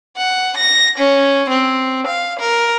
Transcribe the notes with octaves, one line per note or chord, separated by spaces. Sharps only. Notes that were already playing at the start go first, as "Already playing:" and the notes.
F#5
A#6
C#4
C4
F5
A#4